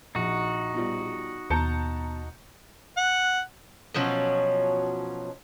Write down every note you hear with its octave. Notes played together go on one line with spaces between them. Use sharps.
A#1 D#4 F#4
B2 F3 G3
D#2 B2 A5 A#5 G6 C#7
F#5
B2 F3 F#3 C#4